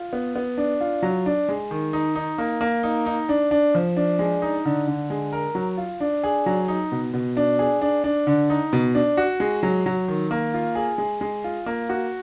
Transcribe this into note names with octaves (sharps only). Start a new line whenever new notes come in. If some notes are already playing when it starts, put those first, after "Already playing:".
Already playing: F4
B3
B3
D4
F4
F#3
D4
G#3
D#3
D#4
D#4
A#3
A#3
D#4
D#4
D4
D4
F3
D4
G#3
D#4
D3
D3
G#3
A#4
F#3
F4
D4
G#4
F#3
D#4
B2
B2
D4
G#4
D4
D4
D3
D#4
B2
D4
F#4
G#3
F#3
F#3
D#3
A#3
F4
G#4
G#3
G#3
F4
A#3
F#4